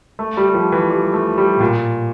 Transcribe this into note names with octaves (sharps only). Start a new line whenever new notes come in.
A3
G3
G3
F3
E3
G3
A3
G3
A2
A#2